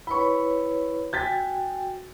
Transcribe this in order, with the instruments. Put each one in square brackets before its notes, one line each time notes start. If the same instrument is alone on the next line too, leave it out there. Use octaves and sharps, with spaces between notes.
[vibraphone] E4 B4 C#5 [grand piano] B5 C#6
[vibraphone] F#4 G5 G#5 [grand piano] G6 A6 B6